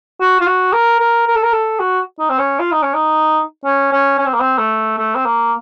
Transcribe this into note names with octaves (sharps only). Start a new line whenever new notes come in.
F#4
F4
F#4
A#4
A#4
A#4
A4
A#4
A4
F#4
D#4
C4
C#4
F4
D#4
C#4
D#4
C#4
C#4
C#4
C4
A#3
C4
A3
A3
C4
A#3